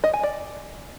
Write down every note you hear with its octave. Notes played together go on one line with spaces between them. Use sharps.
D#5
G#5
D5